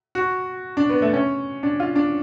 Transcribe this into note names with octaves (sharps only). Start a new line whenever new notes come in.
F#4
D4
B3
A3
C#4
D4
F4
D4